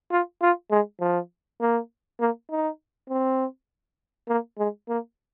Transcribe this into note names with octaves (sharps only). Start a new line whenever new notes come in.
F4
F4
G#3
F3
A#3
A#3
D#4
C4
A#3
G#3
A#3